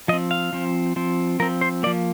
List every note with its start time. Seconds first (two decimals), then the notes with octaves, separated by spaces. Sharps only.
0.08 F3 D#5
0.13 C4
0.31 F5
0.53 F3 C4
0.96 F3 C4
1.40 F3 C4 A#4
1.61 C5
1.83 F3 A#3 D5